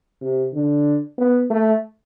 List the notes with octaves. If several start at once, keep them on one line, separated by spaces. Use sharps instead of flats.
C3
D3
B3
A3